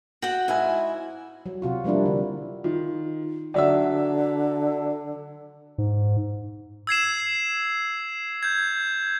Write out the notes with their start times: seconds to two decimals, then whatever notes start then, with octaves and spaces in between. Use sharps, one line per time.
0.22 F#4 F#5 G5
0.48 G#2 E4 G#5
1.46 F#3
1.62 C3 F4 F#4
1.84 F3 G3 A#3 D4 E4
2.06 D3
2.64 D#3 F4
3.54 D3 F#3 D5 E5 F#5 E6
5.78 G#2
6.87 E6 G#6 C7 E7
8.43 G6 G#6